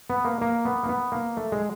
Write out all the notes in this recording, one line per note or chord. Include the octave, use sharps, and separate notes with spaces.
B3
A#3
A#3
B3
A#3
B3
A#3
A3
G#3